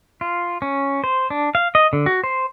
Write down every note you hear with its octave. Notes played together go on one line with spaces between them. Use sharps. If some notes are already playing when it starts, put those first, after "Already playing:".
F4
C#4
C5
D4
F5
D#5
D3
F#4
C5